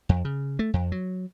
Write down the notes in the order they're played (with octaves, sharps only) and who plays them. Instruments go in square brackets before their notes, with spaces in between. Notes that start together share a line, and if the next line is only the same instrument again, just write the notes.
[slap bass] F2
C#3
A3
F2
F#3